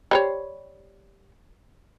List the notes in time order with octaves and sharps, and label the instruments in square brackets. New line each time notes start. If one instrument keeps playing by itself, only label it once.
[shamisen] G3 C5 C#5